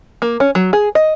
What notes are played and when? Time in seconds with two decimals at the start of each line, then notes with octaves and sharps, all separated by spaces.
0.22 A#3
0.40 C#4
0.55 F#3
0.73 G#4
0.95 D#5